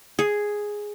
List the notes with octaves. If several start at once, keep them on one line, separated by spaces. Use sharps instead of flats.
G#4